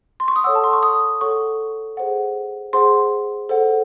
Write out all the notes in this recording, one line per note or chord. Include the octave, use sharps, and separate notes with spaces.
C6
C#6
D#6
A4 C#5 F#5 E6
A5
C6
C#6
D#6
A4 C#5 F#5 C#6
G#4 C5 F#5
G#4 C5 F#5 C6
A4 C5 F#5